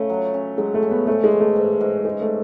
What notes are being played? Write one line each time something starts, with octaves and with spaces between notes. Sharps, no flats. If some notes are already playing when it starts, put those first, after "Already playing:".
Already playing: C#3 A3 C#4
F#3
C#4
F#3 G#3
A3
C#4
B3
G#2 A3
G#3
E3
A3
G#2
G#2
G#3 C#4
A3